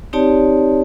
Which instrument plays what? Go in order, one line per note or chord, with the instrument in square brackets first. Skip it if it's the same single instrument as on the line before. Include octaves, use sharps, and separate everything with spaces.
[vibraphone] C4 D#4 G4 C#5 D5 A5